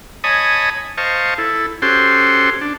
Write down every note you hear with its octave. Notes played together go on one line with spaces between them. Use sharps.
C#5 D#5 G#5 A5 B5 D#6
C5 D#5 F5 A5 C#6
E4 A4
C#4 F#4 G4 A4 C5 C6
D4